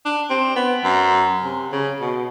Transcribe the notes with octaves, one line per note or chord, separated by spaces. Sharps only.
D4
C4
B3
F#2
C3
C#3
B2